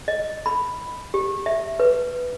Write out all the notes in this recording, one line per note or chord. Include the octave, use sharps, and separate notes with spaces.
D#5
B5
G4
E5
B4